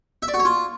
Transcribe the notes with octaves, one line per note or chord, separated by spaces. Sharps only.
E5
D5
F#4
C#5
F4